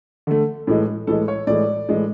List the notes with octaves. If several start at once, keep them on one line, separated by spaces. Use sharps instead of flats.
D3 A3
A2 E3 G#3
A2 E3 G#3 A4
C#5
A2 E3 G#3 D5
A2 E3 G#3